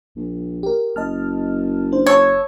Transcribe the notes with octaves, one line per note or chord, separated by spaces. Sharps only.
A#1
G4 A#4
F#1 D#5 A5 F6
D4 C5
C#5 A5 E6 G#6